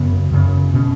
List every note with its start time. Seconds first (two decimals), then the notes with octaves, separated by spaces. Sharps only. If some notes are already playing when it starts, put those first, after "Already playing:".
Already playing: F#2 C#3 B3
0.31 F#2 C#3
0.74 B2 C#4